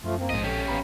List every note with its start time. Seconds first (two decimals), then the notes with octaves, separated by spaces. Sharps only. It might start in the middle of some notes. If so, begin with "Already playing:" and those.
0.04 F#2 F3 A3 F4
0.19 A#3 C4
0.30 A#1 G#2 F3 G#3 D#5
0.43 A#1 C#4 G4 A4 A5
0.68 A1 B3 F5 A#5 B5